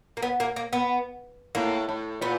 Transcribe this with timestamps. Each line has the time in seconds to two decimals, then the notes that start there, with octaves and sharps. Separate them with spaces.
0.17 A#3
0.22 B3
0.40 A#3
0.56 A#3
0.73 B3
1.55 A2 A#3
1.89 A2
2.21 A#2 B3